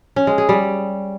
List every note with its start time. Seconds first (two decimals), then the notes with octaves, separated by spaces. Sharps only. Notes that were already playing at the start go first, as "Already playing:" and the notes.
0.16 C#4
0.27 G#3
0.38 G#4
0.49 G3